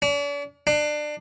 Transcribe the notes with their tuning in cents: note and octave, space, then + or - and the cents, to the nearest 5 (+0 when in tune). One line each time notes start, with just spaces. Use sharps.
D4 -45
D4 +25